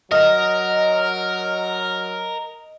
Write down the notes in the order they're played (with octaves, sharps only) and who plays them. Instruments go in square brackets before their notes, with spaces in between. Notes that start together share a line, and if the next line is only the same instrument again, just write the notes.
[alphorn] F#3 [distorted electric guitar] A#4 [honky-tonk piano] D#5 [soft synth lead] F6